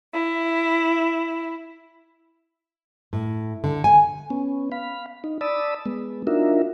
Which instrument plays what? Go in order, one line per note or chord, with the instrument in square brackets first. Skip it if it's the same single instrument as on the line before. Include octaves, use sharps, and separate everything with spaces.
[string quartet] E4
[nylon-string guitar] A2
D3
G#5
[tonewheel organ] B3 C#4
F5 B5
D#4
D5 A5 B5 D#6 E6
G#3 B3
D4 D#4 F4 F#4 A#4 E5